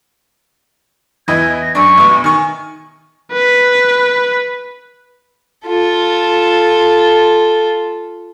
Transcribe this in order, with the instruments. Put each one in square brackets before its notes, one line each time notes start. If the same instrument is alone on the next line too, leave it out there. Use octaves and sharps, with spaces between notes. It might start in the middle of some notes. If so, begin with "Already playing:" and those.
[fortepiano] E2 E4 D#5 [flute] G#6
[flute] A#6
[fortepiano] F#2 D4 [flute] C#6
[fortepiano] A1 B2
[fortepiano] D#3 C#6 [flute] G#5
[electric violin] B4
[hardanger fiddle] F4 A4